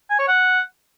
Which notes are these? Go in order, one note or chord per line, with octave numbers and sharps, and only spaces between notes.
G#5
C#5
F#5